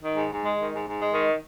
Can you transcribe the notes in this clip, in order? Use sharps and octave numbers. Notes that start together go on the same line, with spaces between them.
D#3
G#2
G#2
G#3
D#3
G#2
G#2
G#3
D#3